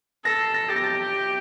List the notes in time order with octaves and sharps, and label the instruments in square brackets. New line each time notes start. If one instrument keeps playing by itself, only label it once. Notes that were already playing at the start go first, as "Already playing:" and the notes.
[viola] A4 [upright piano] A#6
[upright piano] C7
A#6
[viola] G4 [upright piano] A6
[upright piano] A#6
A6